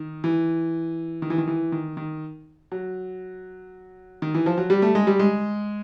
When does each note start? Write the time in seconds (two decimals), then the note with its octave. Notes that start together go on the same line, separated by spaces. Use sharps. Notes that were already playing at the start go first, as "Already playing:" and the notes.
Already playing: D#3
0.24 E3
1.22 D#3
1.30 E3
1.38 D#3
1.48 E3
1.72 D#3
1.97 D#3
2.72 F#3
4.22 D#3
4.34 E3
4.46 F3
4.58 F#3
4.70 G3
4.82 A3
4.95 G#3
5.07 G3
5.19 G#3